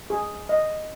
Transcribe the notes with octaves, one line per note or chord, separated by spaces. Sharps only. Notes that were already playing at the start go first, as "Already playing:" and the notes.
G#4
D#5